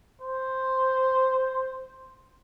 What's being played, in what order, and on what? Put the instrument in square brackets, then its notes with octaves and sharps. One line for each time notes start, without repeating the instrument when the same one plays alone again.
[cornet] C5